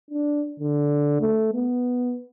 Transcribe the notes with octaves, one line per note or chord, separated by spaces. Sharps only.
D4
D3
A3
B3